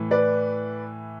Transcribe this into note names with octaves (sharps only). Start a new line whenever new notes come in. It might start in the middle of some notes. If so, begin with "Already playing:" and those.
Already playing: A2 E3
B4 D5